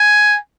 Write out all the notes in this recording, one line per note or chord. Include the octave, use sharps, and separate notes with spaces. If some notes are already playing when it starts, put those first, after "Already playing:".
Already playing: G#5